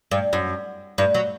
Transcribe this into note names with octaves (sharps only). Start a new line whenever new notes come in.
G2
F#2
G2
F#3